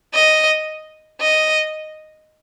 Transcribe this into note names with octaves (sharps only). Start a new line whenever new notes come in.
D#5
D#5